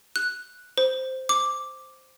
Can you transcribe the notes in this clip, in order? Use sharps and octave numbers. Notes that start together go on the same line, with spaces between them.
F#6
C5
D6